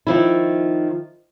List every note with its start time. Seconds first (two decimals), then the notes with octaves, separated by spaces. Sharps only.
0.07 D#3 F3 E4